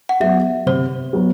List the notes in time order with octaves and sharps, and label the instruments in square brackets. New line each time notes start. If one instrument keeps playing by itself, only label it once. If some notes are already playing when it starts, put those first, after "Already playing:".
[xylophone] F#5
[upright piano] F#3 B3 [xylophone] E5
[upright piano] C3 [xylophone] C5
[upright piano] F#3 B3